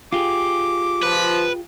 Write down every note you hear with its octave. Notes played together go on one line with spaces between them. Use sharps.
F4 G4 G#4 D6
F3 B4